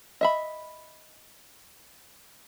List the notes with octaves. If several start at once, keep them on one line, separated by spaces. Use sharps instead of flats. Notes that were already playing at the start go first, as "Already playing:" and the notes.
D#5 E5 B5